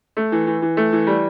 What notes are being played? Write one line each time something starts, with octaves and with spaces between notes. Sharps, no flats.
A3
E3
E3
E3
A3
E3
G3